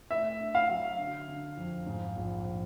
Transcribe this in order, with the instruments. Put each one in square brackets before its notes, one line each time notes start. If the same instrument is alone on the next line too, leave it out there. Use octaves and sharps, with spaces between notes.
[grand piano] A3 [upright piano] E5
[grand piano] D4
[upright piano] F5
[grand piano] F#3
D3
D3
F2
G#2
A#1